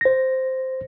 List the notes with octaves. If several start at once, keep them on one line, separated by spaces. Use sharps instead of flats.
C5 A#6